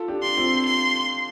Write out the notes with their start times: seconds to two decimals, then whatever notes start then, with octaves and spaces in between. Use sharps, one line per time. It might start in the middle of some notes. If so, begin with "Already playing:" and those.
Already playing: F4 A4
0.08 D4 G4
0.22 C6
0.37 C4 F4
0.66 C6